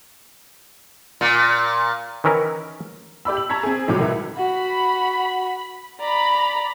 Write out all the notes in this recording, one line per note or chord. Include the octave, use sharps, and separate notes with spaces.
A#2
D#3 E3 C#4 E4 A#4
G4 D5 B5 E6
F#7
A5 A#5 C#6 G#6 B6
C4 G#4
G#1 A2 F3 F#3 D6
G1 C#2 E4 A#4
F#4 B5
D5 A#5 B5